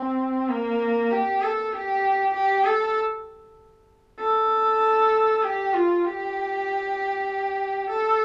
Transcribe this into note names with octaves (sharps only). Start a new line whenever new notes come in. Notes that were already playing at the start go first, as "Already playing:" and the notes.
Already playing: C4
A#3
G4
A4
G4
G4
A4
A4
G4
F4
G4
A4